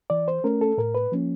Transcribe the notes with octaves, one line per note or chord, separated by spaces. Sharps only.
E3 D5
C5
A3 C#4 A#4
A4
A2 A#4
B4
F3 A#3 C#4